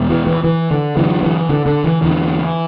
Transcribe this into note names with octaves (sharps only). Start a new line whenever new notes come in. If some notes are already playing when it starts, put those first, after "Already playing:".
Already playing: E2 B2
E3
E3
E3
D3
F#2 D3 E3
E3
D3
D3
E3
E2 D3 E3